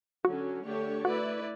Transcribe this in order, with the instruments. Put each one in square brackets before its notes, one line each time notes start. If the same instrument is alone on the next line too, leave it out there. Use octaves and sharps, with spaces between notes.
[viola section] D3 F#3 C#4 [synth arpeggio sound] F#4
[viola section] D3 A3 D4 G4 C#5
[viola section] A3 E4 B4 D5 [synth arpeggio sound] F#4